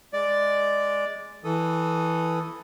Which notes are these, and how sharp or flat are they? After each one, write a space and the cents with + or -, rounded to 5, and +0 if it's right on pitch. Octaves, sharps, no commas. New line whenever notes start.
G#3 +0 D5 +0
E3 +0 A4 +0 D#6 +0